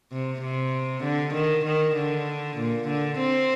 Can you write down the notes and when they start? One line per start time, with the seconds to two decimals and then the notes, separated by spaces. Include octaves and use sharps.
0.12 C3
0.42 C3
1.04 D3
1.34 D#3
1.65 D#3
1.96 D3
2.58 A#2
2.88 D3
3.18 C4